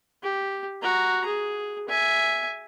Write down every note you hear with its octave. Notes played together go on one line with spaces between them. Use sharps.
G4
F#4 A#5
G#4
E5 G#5